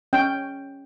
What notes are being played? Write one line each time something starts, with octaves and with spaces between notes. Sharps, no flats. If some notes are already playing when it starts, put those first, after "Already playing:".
C#4 G5